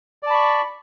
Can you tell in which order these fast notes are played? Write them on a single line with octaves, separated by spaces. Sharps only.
D5 A5 B5 C#6